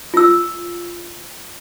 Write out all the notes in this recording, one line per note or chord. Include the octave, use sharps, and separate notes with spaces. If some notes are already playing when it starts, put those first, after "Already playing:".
F4 E6